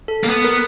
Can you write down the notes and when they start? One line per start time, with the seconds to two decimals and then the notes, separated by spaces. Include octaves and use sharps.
0.08 A4
0.24 A#3
0.29 B3
0.44 A#4